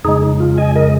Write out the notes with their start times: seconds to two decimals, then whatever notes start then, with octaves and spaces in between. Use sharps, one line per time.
0.04 F2 C#3 G#3 D#4 G#4
0.22 D#4
0.40 F4
0.58 D#5 G#5
0.76 A#4 D#5